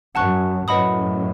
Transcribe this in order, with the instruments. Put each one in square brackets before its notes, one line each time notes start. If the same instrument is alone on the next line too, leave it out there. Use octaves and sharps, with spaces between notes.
[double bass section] F#2 [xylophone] F#5 A5 C#6 F#6
[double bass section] F#2 A2 [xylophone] B4 D#5 F#5 B5 D#6